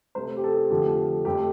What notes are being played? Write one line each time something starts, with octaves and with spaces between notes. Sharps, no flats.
C3 A3 C5
G4
A4
F2 D3 F3 A3 G4
F2 F3 A3 G4